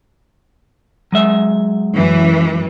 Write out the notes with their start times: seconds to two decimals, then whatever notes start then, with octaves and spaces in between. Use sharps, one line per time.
1.12 F#3 G#3 E5
1.96 F#2 E3